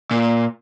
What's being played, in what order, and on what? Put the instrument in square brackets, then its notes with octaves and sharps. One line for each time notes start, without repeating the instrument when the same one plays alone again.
[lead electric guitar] A#2